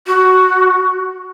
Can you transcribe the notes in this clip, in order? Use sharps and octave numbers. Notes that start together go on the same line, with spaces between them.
F#4